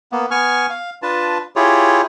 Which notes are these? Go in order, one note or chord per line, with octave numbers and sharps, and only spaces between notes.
A#3 B3
B3 G#5 C#6 F6
F5
D4 F4 B4 A5
E4 F4 G4 G#4 C#5